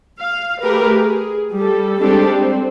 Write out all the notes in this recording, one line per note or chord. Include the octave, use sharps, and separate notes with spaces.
F5
A3 G4 G#4 A#4 B4
G#4
G3 A4
G3 G#3 C4 D4 G4 A4
C4